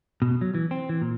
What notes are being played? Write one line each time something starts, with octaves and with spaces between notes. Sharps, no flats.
B2
F#3
E3
C4
E3
A#2